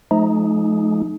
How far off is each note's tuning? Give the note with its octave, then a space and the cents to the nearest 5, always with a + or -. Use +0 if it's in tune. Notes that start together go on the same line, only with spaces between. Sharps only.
F3 +5 A3 -45 D#4 +0